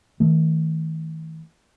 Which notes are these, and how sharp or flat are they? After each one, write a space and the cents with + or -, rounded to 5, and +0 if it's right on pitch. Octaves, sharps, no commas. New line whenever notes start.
D#3 +45 A3 +0